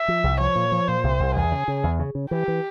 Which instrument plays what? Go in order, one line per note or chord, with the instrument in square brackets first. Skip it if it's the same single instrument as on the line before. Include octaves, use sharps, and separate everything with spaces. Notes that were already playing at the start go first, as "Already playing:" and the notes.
Already playing: [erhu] E5
[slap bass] F3
C2
[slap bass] F3 [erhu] C#5
[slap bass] A#2
F3
[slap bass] A#2 [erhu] C5
[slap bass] C2
C2
[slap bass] E2 [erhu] G#4
[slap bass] C#3
C#3
E2
C#3
C#3
[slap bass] E3 [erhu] G4
[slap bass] E3